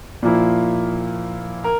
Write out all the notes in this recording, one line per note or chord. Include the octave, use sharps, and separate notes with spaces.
A#2 F3 A#3 E4
A#4